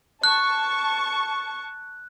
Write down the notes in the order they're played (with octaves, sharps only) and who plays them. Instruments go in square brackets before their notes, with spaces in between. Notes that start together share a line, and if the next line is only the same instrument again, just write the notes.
[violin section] A5 C#6 [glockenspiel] F#6